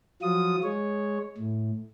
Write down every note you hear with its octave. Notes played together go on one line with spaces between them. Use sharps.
F3 F#3 F4 D#6
G#3 C#5
A2